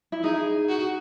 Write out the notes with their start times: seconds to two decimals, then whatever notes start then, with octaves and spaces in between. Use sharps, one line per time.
0.12 E4
0.24 D#4 G#4
0.69 F#4